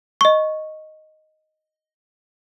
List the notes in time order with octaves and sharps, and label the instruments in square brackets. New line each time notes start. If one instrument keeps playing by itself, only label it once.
[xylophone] D#5 C#6